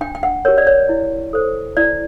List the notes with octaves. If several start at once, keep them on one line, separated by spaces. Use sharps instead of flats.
D4 G5
G5
F#5
G4 A#4 C#5
D5
C#5
E4
A4 C5
E4 D5